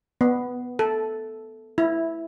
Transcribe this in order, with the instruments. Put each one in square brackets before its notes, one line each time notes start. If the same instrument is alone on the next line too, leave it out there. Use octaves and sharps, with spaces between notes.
[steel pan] B3
A4
E4